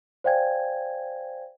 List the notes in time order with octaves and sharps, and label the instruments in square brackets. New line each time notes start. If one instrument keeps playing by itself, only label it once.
[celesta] C5 D5 F5 G5 G#5 G#6